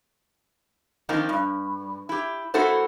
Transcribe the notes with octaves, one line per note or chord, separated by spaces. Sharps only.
D#3 F3 A#3 C4 D#4
G2
E4 G4
A#3 E4 F#4 A4 C5